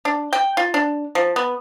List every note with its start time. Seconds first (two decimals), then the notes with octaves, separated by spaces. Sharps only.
0.05 D4
0.33 G5
0.57 F4
0.74 D4
1.15 F3
1.36 B3